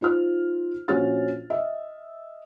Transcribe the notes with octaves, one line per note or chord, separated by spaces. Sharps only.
D#4 F4 C5 F6
A#1 C#4 F#4 C5 F6 A6
D#5 E5